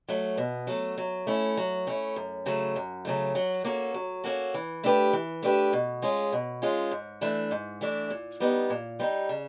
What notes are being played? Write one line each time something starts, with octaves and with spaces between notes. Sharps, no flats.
F#3 A3
B2
F#3 A3
F#3
A3 C#4 E4
F#3
A3 C#4 E4
F#2
C#3 F#3 A3
F#2
C#3 F#3 A3
F#3
A#3 C#4 F#4 A4
F#3
A#3 C#4 F#4 A4
E3
A3 D4 G4 B4
E3
A3 D4 G4 B4
B2
G#3 C#4 F4 G#4
B2
G#3 C#4 F4 G#4
G#2
E3 A3 D4
G#2
E3 A3 D4
A#2
G3 B3 D#4
A#2
G3 B3 D#4
C#3